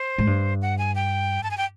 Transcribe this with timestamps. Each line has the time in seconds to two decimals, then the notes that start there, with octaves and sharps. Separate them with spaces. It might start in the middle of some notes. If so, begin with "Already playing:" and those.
Already playing: C5
0.18 G#2
0.27 G2
0.62 F#5
0.78 G#5
0.95 G5
1.43 A5
1.51 G#5
1.58 G5